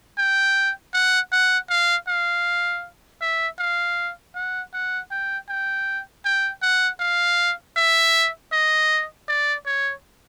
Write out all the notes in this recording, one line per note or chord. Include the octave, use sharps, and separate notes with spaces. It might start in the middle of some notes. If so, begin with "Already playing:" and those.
G5
F#5
F#5
F5
F5
E5
F5
F#5
F#5
G5
G5
G5
F#5
F5
E5
D#5
D5
C#5